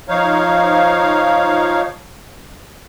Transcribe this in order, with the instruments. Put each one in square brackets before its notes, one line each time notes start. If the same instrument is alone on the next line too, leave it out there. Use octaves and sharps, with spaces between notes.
[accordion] F3 D#4 C#5 F5